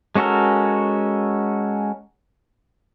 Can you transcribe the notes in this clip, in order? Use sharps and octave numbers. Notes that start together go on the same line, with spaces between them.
G#3 C#4 F#4 A4 A#4